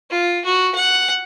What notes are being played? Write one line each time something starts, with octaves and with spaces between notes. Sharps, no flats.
F4
F#4
F#5